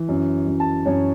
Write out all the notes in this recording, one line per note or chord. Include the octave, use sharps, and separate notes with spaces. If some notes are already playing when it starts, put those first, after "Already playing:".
Already playing: E3
F#2
F#2
A5
F#2 C#5